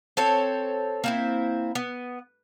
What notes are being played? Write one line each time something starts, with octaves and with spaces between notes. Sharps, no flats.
C4 A4 C#5
A#3 C4 E4
B3